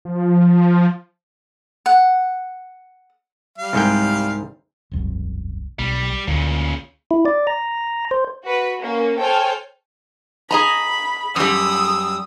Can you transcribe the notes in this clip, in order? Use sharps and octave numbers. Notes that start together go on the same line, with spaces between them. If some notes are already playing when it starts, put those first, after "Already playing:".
F3
F#5
G3 F5
C2 G#2 G5
E1 C2 F#2
B1 G3
D2 A#2 C#3
E4
D5
A#5
C5
F#4 B4
A#3 C#4
A4 C5 C#5 G5 G#5 F6
G#4 D#5 A#5 B5
F#2 G3 D#6 E6